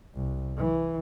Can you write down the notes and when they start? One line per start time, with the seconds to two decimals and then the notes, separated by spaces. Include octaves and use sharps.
0.15 C2
0.57 E3